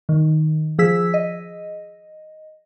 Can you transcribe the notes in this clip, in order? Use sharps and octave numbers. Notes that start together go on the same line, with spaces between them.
D#3
F3 G#4 E6 B6
D#5